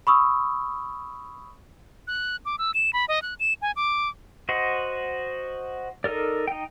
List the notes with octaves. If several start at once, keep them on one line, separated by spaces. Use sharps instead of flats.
B5 C#6 D#6 E6
F#6
D6
E6
E7
B5
D#5
F#6
E7
G#5
D6
F#4 C5 D#5 F#5
D#4 A4 A#4 D5
D#4 G5